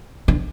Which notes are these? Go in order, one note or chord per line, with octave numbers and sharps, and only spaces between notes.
D3